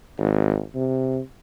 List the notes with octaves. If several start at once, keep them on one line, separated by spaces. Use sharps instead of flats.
G#1
C3